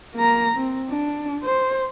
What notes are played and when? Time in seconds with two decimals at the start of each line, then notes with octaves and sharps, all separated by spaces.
0.15 A#3 A#5
0.57 C4
0.90 D4
1.43 C5